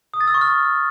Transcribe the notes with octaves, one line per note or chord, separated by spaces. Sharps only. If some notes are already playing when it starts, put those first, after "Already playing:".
D#6
A6
E6
C#6
F6